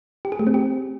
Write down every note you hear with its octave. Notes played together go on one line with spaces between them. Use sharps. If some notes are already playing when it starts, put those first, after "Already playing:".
G4
G#4
A3
C4
G4